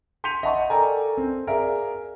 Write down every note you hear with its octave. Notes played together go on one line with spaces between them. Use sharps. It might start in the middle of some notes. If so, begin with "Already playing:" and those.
C6 G6 B6 C#7 D#7 F7
D#5 E5 F#5 A5 B5 C#6
A4 A#4 D5 G5 G#5 A#5
C4
G#4 A#4 D5 E5 F5